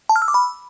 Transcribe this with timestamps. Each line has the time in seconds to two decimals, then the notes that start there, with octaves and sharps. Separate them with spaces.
0.09 A5
0.16 F6
0.22 E6
0.28 D6
0.34 B5